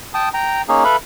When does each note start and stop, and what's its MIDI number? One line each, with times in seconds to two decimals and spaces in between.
0.14 0.29 79
0.14 0.29 81
0.14 0.29 87
0.34 0.62 79
0.34 0.62 82
0.69 0.84 58
0.69 0.84 61
0.69 0.84 63
0.69 0.84 68
0.84 0.96 69
0.84 0.96 71
0.84 0.96 76
0.84 0.96 77
0.84 0.96 83